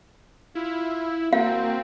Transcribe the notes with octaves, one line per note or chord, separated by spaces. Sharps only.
E4 F4
A#3 C4 F#4 F5